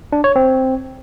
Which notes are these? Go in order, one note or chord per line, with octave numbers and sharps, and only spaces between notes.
D4
C#5
C4